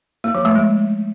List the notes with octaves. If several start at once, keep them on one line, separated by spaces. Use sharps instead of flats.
A#3
F3
A3
G#3